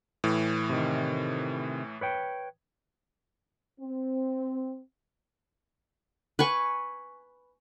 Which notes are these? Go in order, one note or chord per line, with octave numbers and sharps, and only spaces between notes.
A2 E3
C3 D#3
B4 C#5 G5
C4
B4 G#5 C#6